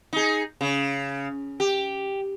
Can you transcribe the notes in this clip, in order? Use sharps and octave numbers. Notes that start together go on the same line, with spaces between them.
D#4 G#4
C#3
G4